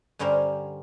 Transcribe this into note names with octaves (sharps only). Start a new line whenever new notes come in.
G2 D3 G3 C#4 A#4 C5